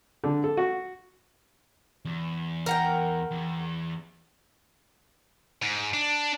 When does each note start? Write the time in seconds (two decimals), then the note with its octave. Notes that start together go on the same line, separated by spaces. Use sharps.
0.24 D3
0.44 A4
0.57 F#4
2.05 E2
2.66 A#4 F#5 G5
3.31 E2
5.62 G#2
5.94 D4